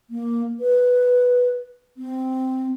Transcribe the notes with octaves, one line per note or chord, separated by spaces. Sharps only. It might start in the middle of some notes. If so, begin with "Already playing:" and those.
A#3
B4
C4